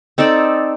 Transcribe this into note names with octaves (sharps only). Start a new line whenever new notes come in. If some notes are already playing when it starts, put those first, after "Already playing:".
C4 D#4 A4 D5